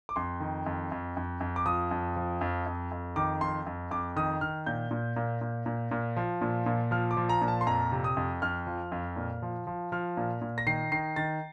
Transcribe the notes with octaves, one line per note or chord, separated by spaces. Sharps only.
D6
F2 C6
D#3
F2
F2
F2
F2
D6
F3 D#6
F2
F3
F2
F2
F2
D#3 D6
F2 C6
F2
F2 D6
D#3 D#6
D#3 F6
A#2 G6
A#2
A#2
A#2
A#2
A#2
F3
A#2
A#2
F3 F6
D6
F3
A#5
A#2
A5
C6
F2 A#5
C3
D#6
F2
F2 F6
F3
F2
A#2
F3
F3
F3 F6
A#2
A#2
A#6
D#3 C7
D#3 C7
D#3 A6